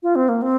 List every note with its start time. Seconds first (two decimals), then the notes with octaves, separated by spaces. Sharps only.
0.03 F4
0.16 C4
0.29 A#3
0.42 C4